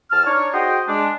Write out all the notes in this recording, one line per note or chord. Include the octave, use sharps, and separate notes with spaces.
E2 A5 F6
D4 D#4 C#5
F#4 G#4 C5 D#5 G5
G#3 D4